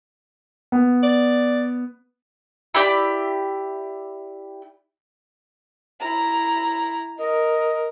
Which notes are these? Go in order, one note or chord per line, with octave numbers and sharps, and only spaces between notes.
B3
D5
E4 G4 D5
E4 A#5
A#4 D#5